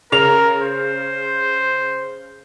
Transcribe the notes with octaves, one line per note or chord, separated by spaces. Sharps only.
C#3 A#4 F7
C5